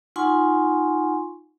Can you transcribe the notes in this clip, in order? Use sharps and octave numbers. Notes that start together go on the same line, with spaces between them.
D#4 F4 F#5 G#5 C6 C#6